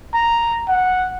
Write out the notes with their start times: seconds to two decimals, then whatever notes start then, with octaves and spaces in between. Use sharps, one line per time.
0.14 A#5
0.68 F#5